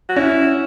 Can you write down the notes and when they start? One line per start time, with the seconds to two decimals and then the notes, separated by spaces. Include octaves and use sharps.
0.09 F#4
0.16 C#4 E4